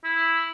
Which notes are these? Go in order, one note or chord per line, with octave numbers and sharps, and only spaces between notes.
E4